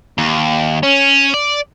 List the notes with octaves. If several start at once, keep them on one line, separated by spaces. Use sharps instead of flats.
D#2
C#4
D5